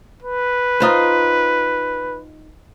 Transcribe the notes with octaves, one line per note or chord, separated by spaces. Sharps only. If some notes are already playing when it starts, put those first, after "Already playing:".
B4
D#4 F4 C5